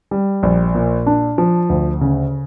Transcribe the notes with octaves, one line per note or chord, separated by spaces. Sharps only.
G3
A#1
A#2
D4
F3
D2
C#3